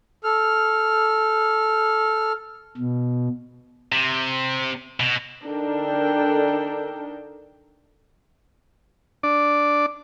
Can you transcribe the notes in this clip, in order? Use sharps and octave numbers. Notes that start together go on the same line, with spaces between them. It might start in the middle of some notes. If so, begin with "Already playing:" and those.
A4 F6
B2
C3
B2
D3 D4 D#4 A4 A#4 G5
D4 D5